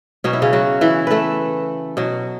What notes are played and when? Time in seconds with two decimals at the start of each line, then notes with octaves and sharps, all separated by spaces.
0.24 B2 F#3 C#4
0.33 E4
0.42 C#3 C#4
0.53 F#3 F#4
0.81 E3 E4
1.07 A3 A4 B4
1.97 B2 F#3